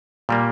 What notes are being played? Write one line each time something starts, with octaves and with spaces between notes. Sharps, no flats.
A#2 G3 A#3